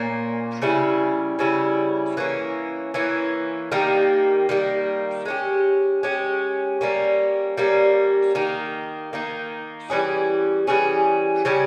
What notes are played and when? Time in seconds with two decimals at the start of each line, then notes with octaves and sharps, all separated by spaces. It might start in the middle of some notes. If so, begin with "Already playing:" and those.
Already playing: A#2 A#3 C#4
0.62 C#3 G3 C#4 E4
1.39 C#3 G3 C#4 E4
2.17 E3 A#3 C#4
2.94 E3 A#3 C#4
3.72 D#3 G3 A#3
4.49 D#3 G3 A#3
5.25 G#3 C#4 G4
6.03 G#3 C#4 G4
6.81 G3 A#3 C#4
7.57 G3 A#3 C#4
8.35 D#3 A#3 D#4
9.13 D#3 A#3 D#4
9.90 E3 G3 C#4 G#4
10.67 E3 G3 C#4 G#4
11.45 C#3 G3 C#4 G#4